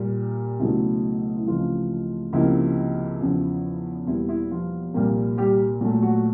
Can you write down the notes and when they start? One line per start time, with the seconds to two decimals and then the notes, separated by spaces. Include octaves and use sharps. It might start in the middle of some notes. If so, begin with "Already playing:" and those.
Already playing: A#2 G3 A#3
0.59 C#2 B2 F#3 A3 E4
1.36 E4
1.46 C#2 C3 E3 F3 A3 F4
2.33 C#2 C3 F3 A#3 E4
3.21 E2 C#3 F3
4.07 E2 B2 G3 A#3 E4
4.29 E4
4.51 F3 F4
4.94 C2 A#2 G3 A#3
5.38 G3 G4
5.81 A#2 F#3 A3
6.02 F#3 F#4